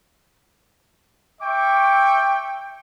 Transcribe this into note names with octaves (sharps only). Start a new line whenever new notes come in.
E5 G5 C#6 D6